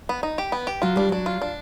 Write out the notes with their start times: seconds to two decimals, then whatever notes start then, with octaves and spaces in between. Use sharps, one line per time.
0.09 B3
0.23 D#4
0.38 G4
0.52 B3
0.67 G4
0.82 F#3 F4
0.96 G3 D4
1.09 F#3 D4
1.26 F4
1.42 D4